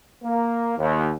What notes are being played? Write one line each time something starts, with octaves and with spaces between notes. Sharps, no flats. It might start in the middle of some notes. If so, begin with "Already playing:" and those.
A#3
D#2